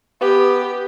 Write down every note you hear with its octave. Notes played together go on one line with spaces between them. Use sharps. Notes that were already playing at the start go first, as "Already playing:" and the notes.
B3 G4